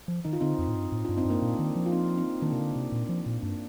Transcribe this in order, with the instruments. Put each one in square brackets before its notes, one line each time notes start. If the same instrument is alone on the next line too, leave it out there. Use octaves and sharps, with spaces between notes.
[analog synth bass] F3
[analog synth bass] D#3 [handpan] D#4
[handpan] F4
[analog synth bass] D3 [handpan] C4 D#4
[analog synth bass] F2
A2
G2
A2
[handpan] D4 F4
[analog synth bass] G2
[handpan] C4 D#4
[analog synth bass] G2 [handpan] A#3 D4
[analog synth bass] A#2
D#3
F3
[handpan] F4
C4 D#4
C4 D#4
[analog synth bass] D#3 [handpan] A#3 D4
[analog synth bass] C3
D3
C3
A#2
F3
A#2
[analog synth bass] G2 [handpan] A#3 D4